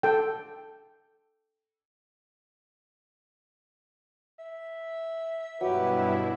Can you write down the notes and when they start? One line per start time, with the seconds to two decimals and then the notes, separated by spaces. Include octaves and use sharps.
0.03 A4 G5
4.39 E5
5.61 G2 B2 F#3 E4 G4 B4